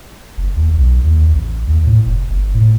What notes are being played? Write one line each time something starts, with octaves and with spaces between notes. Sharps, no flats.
F#1
D#2
B1
D#2
A1
D#2
A2
F1
G1
A2